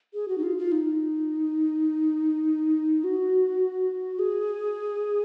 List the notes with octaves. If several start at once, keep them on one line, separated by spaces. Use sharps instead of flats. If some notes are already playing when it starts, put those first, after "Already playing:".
G#4
F#4
D#4
F4
F4
D#4
F#4
G#4